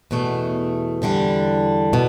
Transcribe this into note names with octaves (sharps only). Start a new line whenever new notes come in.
E2 B2 A3
E2 D3 G3 D4
B2